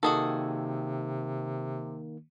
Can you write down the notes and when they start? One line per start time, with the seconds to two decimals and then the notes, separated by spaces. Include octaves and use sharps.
0.03 C3 D#3 A#3 F#4 G#4 A4